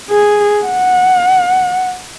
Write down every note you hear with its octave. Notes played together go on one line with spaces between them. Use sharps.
G#4
F#5